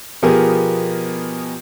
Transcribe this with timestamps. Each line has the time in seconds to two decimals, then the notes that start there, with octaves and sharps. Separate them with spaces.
0.22 B2 F3 B3 G4 G#4 A#4